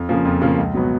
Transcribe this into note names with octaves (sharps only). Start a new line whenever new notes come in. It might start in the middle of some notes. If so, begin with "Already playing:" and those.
Already playing: F2
C#3 F3 A#3
F2
C#3 F3 A#3
C#2
B2 F#3 B3